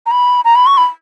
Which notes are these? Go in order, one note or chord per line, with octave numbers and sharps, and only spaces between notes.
A#5
B5
A#5
B5
C#6
B5